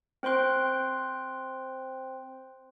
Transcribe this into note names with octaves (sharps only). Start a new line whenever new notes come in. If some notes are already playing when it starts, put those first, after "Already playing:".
C4 C5 G5 C6 F#6